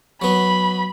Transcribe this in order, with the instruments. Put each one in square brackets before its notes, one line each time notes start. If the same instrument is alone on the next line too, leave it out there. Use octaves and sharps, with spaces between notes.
[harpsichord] F#3 B3 [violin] B5